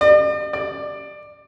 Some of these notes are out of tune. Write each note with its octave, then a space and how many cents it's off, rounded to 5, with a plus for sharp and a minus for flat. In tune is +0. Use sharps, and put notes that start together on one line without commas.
D5 +45
D5 +15